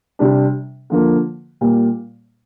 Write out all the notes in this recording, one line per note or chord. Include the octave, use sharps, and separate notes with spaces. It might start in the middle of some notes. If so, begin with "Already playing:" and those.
C3 G3 D4
D3 F3 A#3
A#2 G3 A#3